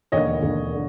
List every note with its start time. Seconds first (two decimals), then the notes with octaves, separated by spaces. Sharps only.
0.12 E1 D#2 D3 C#5 D#5
0.41 E1 D#2 D3
0.73 D3